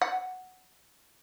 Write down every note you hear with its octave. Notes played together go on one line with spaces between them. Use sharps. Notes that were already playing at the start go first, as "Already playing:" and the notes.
F#5